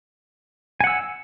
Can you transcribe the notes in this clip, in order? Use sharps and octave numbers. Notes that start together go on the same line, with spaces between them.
F#5 G#5 E6